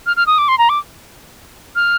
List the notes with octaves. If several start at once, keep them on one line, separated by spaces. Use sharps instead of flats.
F6
F6
D#6
D6
C6
A#5
D6
F6